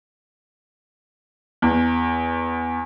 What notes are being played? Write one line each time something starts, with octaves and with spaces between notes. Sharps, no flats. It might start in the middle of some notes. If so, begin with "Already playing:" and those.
E2